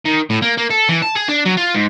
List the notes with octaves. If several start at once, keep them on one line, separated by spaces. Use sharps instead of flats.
D#3
A2
A#3
A#3
A4
E3
A5
G#4
D4
F#3
F4
G#2